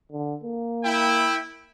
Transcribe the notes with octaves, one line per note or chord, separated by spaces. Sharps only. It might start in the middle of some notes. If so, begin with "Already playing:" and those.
D3
A#3
E4 G5